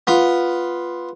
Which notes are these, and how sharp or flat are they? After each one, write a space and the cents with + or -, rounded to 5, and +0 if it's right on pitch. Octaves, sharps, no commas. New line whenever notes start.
B3 +0 F4 +0